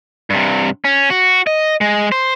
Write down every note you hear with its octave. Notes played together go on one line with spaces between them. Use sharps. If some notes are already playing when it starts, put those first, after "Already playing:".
G2 C3
C#4
F#4
D#5
G#3
C5